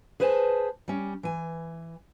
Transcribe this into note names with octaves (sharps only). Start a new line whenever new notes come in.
G#4 B4 C5 G#5 A5
G3 C#4
E3 G#5